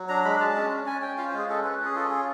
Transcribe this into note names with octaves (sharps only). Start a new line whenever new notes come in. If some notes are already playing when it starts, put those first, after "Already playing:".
Already playing: F#3
D4 A#5
G#3 B5
G#3 A5
C#4
C#4
C#4 G#5
C#4 G5
F4 F5
C5
G#3
G#4
C#4 A4
C#4 B4
C#4
G#4
F4 A4
C#4 G#4